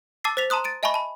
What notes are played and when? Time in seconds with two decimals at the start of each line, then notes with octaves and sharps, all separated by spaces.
0.24 A5 D6 E6 A6 C7
0.37 C5 A6 B6 F7
0.50 A5 A#5 C6 D#6 F#6
0.64 A6 D7 D#7
0.83 D#5 E5 G#5 A5 B5 C#6
0.94 A5 B5